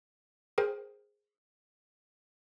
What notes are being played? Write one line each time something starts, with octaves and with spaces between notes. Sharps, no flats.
G#4 A#4 C5 G5